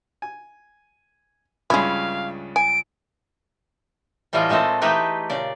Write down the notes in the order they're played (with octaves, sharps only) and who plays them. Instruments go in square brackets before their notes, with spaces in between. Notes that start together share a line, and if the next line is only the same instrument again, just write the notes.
[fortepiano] G#5
[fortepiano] C#2 G2 C#3 [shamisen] G#3 E4 [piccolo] F5
[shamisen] G#5 [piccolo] D7
[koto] A2 E3 G3 A3 F4 D#5
A#2 G#3 A3 C4 A4
E3 G#3 A3 D#4 G4 B4
A#2 C#3 D5